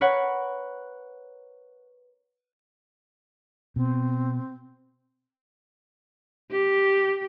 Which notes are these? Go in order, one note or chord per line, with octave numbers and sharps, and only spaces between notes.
A#4 B4 C#5 F#5
B2 C4
G4